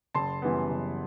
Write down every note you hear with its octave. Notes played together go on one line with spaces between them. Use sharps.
F#1 A5 C6
F#2 E3 G3 B3
F#1